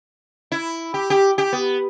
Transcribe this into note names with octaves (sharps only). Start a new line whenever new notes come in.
E4
G4
G4
G4
B3